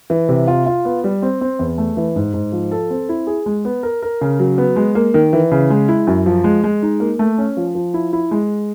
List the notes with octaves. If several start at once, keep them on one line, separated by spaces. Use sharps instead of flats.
E3
C3
F4
F4
B3
G3
C4
C4
E2
A3
E3
G#2
G#2
F3
A4
C4
E4
G#4
G#3
B3
A#4
A#4
C#3
F#3
B3
G#3
A#3
D#3
E3
C#3
G#3
E4
F#2
F3
G#3
G#3
D#4
A#3
A3
C#4
F3
F3
E4
E4
G#3